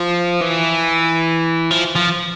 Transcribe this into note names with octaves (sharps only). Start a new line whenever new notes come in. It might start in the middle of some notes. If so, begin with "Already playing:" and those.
Already playing: F3
E3
F3
F3